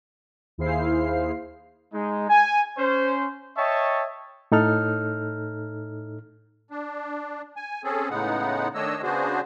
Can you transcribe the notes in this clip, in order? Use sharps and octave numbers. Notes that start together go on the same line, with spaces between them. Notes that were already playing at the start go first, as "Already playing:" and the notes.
D#2 E4 G#4 C5 F5 C7
G#3 D#4
G#5
C#4 C5
C#5 D#5 E5 G5 A5 C#6
A2 D#4 A4 F6
D4
G#5
C4 C#4 G#4 A4
A2 C#3 G#3 B3 D#4 F#5
D#3 A3 D4 C#5 D#5 E6
C#3 B3 D4 F#4 G#4 C5